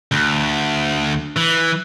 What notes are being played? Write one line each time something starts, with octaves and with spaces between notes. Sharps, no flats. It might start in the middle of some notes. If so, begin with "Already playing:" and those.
D2
E3